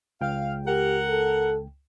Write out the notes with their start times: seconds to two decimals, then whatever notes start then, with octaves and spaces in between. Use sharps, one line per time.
0.21 C#2 F5 G5
0.66 G4 A#4 F#5
1.09 A4